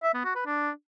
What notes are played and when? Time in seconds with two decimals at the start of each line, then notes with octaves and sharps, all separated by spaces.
0.03 E5
0.14 B3
0.25 F#4
0.35 B4
0.46 D4